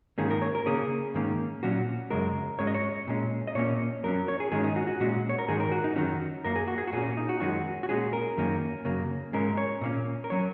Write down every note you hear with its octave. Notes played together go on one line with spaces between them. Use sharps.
G#2 D#3 A#3 C#4 G#4
A#4
C#5
A#4
C#3 A#3 C#4 G#4
G#2 D#3 A#3 C#4
A#2 F#3 C#4 F#4
F#2 C#3 G#3 A#4
G#2 G#3 C#4 C#5
D#5
C#5
A#2 G#3 C#4
D#5
A#2 A#3 C#4 C#5
F#2 F#3 C#4 A#4
C#5
G#4
G#2 D#3 G#3 C#4 G#4
D#4
F#4
F#4
A#2 G#3 C#4 F#4
C#5
A#4
G#2 D#3 G#3 G#4
A#4
F#4
D#4
F#2 D#3 F#3 C#4 F#4
F#2 F#3 A#3 A#4
G#4
F#4
G#4
F#4
A#2 A#3 C#4 G#4
D#4
F#4
F#2 D#3 G#3 C#4 F#4
F#4
A#2 G#3 C#4 G#4
A#4
F#2 D#3 A#3 C#4
F#2 C#3 A#3
G#2 G#3 C#4 A#4
C#5
A#2 A#3 C#4
A#4
F#3 C#4 C#5